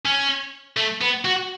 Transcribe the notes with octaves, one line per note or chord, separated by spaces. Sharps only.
C#4
A3
B3
F#4